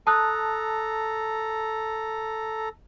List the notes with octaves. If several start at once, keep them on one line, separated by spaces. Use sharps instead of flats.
A4 A5 A#5 D#6 F#6